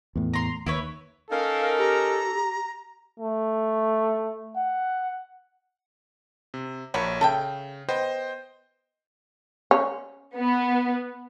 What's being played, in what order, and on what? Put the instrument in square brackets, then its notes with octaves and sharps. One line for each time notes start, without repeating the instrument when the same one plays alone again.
[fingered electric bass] E2 A2
[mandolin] A#5 C6
[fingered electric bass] D#2 [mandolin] E4 B4 C#5
[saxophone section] C#4 D#4 A#4 [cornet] A4 [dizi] F5
[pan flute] G4 [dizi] A#5
[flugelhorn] A3
F#5
[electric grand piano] C3
[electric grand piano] A#1 C#5 B5 [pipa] D3 A#3 F#4
[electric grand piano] C#3 [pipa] A4 E5 G5
[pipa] B3 [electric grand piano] C5 D#5 G5
[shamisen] C#4
[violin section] B3